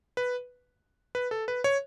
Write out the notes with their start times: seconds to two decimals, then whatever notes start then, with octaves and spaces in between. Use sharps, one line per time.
0.17 B4
1.15 B4
1.31 A4
1.48 B4
1.64 C#5